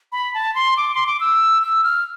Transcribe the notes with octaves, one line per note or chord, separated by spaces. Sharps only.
B5
A5
C6
D6
C6
D6
E6
E6
F6